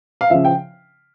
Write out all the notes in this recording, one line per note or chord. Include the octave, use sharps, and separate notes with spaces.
F5
C#3 F3 E5
G5